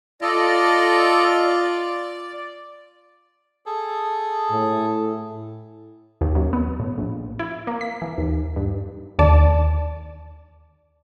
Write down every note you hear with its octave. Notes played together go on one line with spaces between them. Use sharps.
F4 A4 D5 D#5
D5
G#4 A4
A2
D#2
F#2
B3
A2
A#1
E4
A#3
B6
E3
D#2
G2
D#2 D5 A5